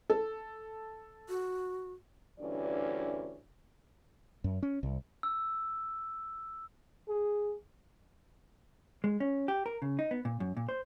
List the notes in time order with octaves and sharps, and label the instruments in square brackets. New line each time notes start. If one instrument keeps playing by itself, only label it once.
[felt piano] A4
[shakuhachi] F#4
[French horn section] D2 G2 E3 C#4 D5
[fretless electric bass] F#2
C#4
C2
[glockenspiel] E6
[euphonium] G#4
[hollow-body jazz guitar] G#3
C#4
G4
A#4
C#3
D#4
B3
A#2
F#2
A#2
C5